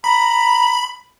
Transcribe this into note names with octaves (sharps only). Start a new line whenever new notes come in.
A#5 B5